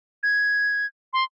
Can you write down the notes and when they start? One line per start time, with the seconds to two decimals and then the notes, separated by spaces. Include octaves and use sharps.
0.23 G#6
1.13 C6